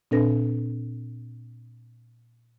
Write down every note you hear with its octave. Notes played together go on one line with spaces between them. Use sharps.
A#2 C4 D4 A4 B4 A#6